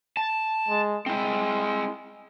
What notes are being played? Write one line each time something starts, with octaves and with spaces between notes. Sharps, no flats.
A5
G#3
G#3 C4 E4